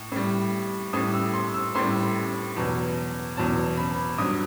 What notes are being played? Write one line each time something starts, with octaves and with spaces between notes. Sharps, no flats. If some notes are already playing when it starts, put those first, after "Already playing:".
Already playing: A2
A2 G3
A2 G3 D#6
E6
C6
E6
A2 G3 C6
E2 B2 F#3
E2 B2 F#3 A5
B5
G2 F#3 D#6